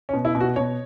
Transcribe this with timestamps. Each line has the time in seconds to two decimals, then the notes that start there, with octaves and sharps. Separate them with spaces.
0.09 C#4
0.14 B2
0.25 E4
0.35 B2
0.40 F#4
0.56 B2 C#5